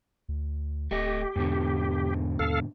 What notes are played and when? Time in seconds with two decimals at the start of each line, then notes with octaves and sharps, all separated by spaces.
0.29 D2
0.91 D1 A3 G4 D#5
1.36 E2 G#2 B2 D3
2.39 D#2 A4 F5